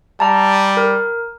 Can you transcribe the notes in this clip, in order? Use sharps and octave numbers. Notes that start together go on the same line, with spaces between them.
G3 A5 A#5
A#4